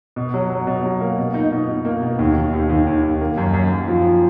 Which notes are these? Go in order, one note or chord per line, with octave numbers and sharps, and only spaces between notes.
B2
F#3
F#3
B2
F#3
A#3
B2
D#4
B2
B2
A#3
B2
D#2
D#3
D#2
D#2
D#2
D#2
A#3
F#2
F#2
F#2
F3